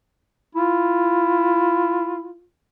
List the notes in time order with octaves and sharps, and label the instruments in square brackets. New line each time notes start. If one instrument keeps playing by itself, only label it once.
[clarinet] E4 [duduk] F4